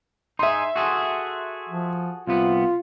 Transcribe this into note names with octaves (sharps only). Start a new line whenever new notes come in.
D#4 G#4 E5 C6
F#4 G#4 A4
F3
C2 C3 B3 F4